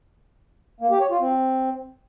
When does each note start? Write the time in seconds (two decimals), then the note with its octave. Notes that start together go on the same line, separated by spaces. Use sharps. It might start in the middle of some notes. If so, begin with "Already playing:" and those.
0.81 A#3
0.91 G4
1.01 C#5
1.11 F4
1.21 C4